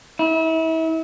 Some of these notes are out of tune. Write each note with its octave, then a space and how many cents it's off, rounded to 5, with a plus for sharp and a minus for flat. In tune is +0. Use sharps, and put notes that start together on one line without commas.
E4 -35